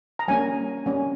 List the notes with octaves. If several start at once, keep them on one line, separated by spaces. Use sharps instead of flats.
A#5
G3 A#3 C#4 G#5
G3 A#3 C#4